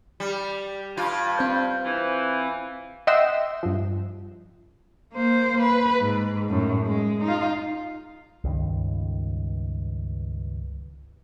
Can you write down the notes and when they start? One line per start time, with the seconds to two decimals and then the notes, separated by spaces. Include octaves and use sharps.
0.20 G3
0.97 G2 F4 F5
1.37 C4 C5 G6
1.85 E3
3.07 D#5 E5 F#5 G5 C6 E6
3.63 G2 F3
5.14 A#3 C5
5.61 B4
6.00 G#2
6.49 F#2 A2
6.86 G#3
7.24 D#4 F4
8.44 C#2 G2 D#3